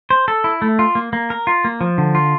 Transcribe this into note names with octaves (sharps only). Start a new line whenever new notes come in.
C5
A4
E4
A3
F4
A#3
A#3
A#4
F4
A#3
F3
D3
F4